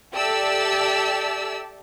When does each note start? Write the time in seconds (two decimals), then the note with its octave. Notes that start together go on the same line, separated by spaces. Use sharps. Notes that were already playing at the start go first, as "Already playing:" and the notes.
0.15 G4 A4 D5 E5 A5 E6